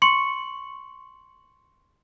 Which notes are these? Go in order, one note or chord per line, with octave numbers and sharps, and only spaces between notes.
C6 C#6 C#7 F#7